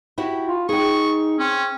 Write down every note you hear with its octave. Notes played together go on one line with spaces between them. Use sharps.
E4 F#4 G4
F4
D#4 G#4 G5 C#6
C4 C#4